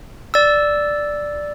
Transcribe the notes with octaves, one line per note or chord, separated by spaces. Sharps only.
D5 E6